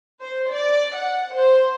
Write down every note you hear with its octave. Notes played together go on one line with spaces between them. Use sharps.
C5
D5
F#5
C5